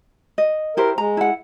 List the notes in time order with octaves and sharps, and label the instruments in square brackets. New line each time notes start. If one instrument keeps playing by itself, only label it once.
[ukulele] D#5
[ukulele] E4 G4 C5 [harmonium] A#4
[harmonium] G#3 [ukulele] A#5
[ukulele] E4 F#5